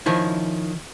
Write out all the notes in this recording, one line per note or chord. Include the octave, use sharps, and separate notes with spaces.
D#3 F3 C#4 E4